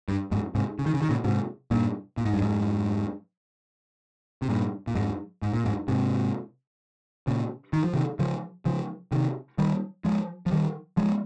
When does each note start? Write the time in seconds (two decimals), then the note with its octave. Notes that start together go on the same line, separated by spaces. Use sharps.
0.08 G2
0.31 F2 G#2
0.55 G#2 C3
0.79 C#3
0.86 D#3
0.94 C#3
1.02 D#3
1.09 A#2 C#3
1.24 G#2 C3
1.71 G2 A#2
2.17 A#2
2.25 G#2
2.33 G2
2.40 F2 G#2
4.42 C3
4.49 G2 A#2
4.87 A#2
4.95 F2 G#2
5.42 G#2
5.53 A#2
5.65 F2 G#2
5.88 G#2 C3
7.27 A#2 C#3
7.73 D#3
7.84 F3
7.94 C3 D#3
8.19 C#3 F3
8.65 C#3 F3
9.12 C3 D#3
9.58 D#3 G3
10.04 F3 G#3
10.46 F3
10.51 D#3 G3
10.97 F3 G#3